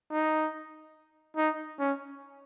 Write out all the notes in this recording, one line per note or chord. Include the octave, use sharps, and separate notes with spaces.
D#4
D#4
C#4